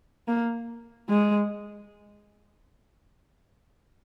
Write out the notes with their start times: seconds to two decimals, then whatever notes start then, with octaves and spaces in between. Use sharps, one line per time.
0.28 A#3
1.10 G#3